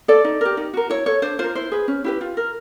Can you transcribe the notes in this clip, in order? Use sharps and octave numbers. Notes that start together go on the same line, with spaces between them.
A4 D5
D#4
G4 A#4
D#4
F#4 A#4
E4 C#5
A4 C#5
D4 C5
F4 A#4 C5
E4 C5
G#4 B4
C#4
E4 G4 B4
F4
A#4